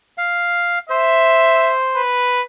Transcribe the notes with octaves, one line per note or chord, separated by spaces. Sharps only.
F5
C5 E5
B4